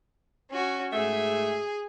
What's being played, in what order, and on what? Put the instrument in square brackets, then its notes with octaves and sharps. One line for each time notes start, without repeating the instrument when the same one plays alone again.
[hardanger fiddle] C#4 F#4
[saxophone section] G#2 A3 E5 [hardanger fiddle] G#4